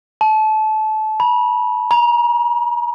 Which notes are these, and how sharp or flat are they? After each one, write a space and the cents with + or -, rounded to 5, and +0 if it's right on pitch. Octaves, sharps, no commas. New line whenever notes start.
A5 -25
B5 -30
A#5 +35